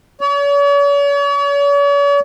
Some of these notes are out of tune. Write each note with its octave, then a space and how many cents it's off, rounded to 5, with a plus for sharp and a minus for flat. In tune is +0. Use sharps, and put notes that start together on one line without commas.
C#5 +45